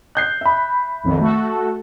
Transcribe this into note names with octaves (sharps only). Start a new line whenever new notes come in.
F#6 G6 C7
E5 B5
B1 F2 D#3
A3 F#4 A4